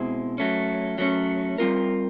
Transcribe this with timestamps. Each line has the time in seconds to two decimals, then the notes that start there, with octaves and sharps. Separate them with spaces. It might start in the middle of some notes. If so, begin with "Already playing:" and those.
Already playing: B2 G#3 C4 E4
0.38 F#3 A3 C#4
0.98 F#3 A3 C#4
1.58 G3 C4 F4 A#4